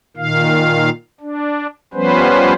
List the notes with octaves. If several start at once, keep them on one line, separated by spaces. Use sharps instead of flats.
A#2 D#3 F5
D4
F3 G3 B3 C#4 B4 C5